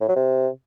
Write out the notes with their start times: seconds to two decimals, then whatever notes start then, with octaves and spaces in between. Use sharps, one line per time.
0.01 A2
0.09 F#3
0.16 C3